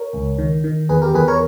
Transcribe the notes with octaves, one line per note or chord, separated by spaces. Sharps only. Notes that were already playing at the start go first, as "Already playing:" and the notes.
Already playing: A#4 C#5
C#2
D#3
D#3
E2 G#4 B4
G4 A#4
E2 G#4 B4
A#4 C#5